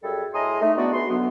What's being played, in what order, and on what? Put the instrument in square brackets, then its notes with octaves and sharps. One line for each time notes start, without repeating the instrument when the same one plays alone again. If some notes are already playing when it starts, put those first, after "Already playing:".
[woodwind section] F#2 G3 G#4 A4
A2 G#4 D#5 A#5 C6 D#6
A3 D#4
E3 G#3 B3 D4 F#4 D5
C#2 B3 F#4 C6
B2 D3 F#3 B3